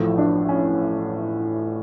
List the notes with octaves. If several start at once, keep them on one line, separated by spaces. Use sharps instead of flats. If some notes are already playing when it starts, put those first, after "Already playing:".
Already playing: A1 A2 F3 A3
D4
C#4